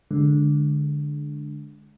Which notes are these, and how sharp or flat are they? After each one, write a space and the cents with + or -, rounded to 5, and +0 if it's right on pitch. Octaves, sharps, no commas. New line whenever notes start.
D3 +0 G#3 +15